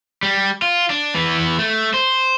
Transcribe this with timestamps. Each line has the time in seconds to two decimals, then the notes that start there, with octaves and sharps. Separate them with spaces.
0.23 G3
0.62 F4
0.90 D4
1.15 E3 B3
1.59 A3
1.94 C5